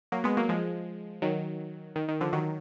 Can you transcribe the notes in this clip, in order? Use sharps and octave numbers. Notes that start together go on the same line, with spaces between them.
F#3 A#3
G#3 B3
F#3 A#3
F3 G#3
D#3 F#3
D#3
D#3
D3 F3
D#3 F#3